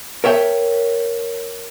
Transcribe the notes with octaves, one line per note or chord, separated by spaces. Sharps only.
A#4 C#5 E5 G5